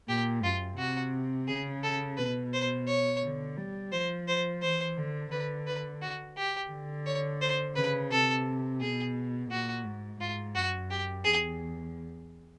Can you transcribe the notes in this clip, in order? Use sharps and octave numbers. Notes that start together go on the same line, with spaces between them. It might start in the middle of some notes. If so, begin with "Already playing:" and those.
A#2 G4
F#2 F4
C3 F#4
C#3 G#4
A4
B2 B4
C5
C#5
D3
G3
F3 C5
C5
E3 C5
D3
D3 B4
B4
F#4
G4
D3
C#5
C5
C#3 B4
C3 A4
B2 G#4
A#2 F#4
G#2
G#2 F4
F#2 F#4
G4
E2 G#4